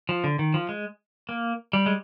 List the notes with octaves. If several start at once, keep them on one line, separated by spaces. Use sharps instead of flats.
F3
D3
D#3
F3
G#3
A#3
G3
G#3